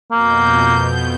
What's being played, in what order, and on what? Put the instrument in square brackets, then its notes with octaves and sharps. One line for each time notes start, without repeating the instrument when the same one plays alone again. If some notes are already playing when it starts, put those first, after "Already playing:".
[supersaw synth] F2 B2 G6 [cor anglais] A#3